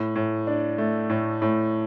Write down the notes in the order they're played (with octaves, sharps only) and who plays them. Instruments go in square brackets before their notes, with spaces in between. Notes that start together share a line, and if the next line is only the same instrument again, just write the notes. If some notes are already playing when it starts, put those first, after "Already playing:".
Already playing: [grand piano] A2
A2
D4
A3
A2
A2